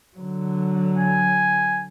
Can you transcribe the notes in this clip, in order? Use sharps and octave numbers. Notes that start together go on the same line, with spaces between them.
D3 F#3
G#5